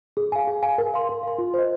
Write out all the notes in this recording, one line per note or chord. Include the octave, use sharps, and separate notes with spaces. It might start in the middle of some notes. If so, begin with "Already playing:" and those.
G#4
F5 G#5
G#4
F5 G#5
A#4
F5 C6
A#4
F5 C6
F4
C5 D#5